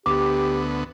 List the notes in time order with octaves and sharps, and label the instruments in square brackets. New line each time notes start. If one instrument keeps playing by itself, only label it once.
[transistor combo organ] D2 B3 [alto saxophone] G4 [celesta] D6